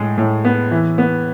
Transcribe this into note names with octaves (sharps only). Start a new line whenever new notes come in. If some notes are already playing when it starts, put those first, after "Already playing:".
Already playing: A2 G#3
A2
B3
E3
B3